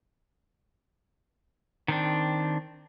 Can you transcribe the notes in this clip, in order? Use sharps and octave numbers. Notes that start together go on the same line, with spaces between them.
D#3 C4 D4